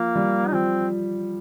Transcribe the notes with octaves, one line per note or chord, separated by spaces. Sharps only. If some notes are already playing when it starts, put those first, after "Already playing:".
Already playing: F3 A#3
G3
D#4
F3 C4